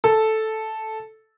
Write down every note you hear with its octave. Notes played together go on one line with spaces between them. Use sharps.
A4